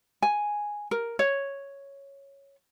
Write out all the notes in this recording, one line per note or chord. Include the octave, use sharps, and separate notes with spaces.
G#5
A#4
C#5